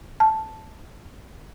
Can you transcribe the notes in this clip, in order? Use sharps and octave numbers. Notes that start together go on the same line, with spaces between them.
A5